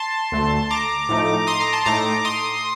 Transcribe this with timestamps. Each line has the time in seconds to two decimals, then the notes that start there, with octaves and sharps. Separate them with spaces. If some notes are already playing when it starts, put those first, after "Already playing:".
Already playing: A5 C6
0.32 D2 D3 A3
0.70 A#5 D6
1.09 A2 F3 A3 D#4
1.47 C6 D#6
1.60 A#5 D6
1.73 A5 C6
1.85 A2 A3 D#4 A#5 D6
2.25 C6 D#6